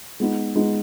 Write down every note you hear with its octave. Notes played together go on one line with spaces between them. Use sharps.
G#3 B3 D#4
G#3 B3 D#4